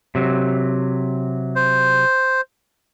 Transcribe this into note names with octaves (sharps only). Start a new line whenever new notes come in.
C3 F#3
C5